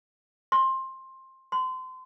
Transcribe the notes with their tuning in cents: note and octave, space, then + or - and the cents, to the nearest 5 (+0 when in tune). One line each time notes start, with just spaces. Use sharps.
C6 +15
C6 -30